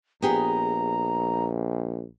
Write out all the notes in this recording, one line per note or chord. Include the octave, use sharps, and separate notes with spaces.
A#1 B3 G4 G#4 A#5